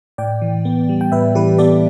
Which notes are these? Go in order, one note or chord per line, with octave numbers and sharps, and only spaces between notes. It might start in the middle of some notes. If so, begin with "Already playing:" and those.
A2 D5 G5
E3
B3
G3
G5
A2 B4 E5
E3 G4 B4
B3 A4 D5